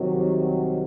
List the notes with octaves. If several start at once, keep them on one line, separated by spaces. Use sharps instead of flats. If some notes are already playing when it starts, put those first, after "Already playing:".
Already playing: C2 C3 D#3 F#3